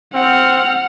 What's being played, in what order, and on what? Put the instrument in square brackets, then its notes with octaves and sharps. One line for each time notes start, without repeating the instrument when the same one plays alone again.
[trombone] C4 [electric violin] F#5 F6